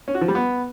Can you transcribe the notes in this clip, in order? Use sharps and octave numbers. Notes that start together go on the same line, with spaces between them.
C#4
F#4
F3
G3
B3